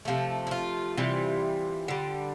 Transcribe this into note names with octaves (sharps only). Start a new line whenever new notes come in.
C3 F3 A3
E4
F4
C3 E3 G3
D3 G3